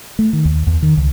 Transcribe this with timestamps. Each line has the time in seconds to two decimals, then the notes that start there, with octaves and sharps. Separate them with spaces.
0.19 A3
0.33 D#3
0.45 D#2
0.67 E2
0.82 D#3
0.97 C#2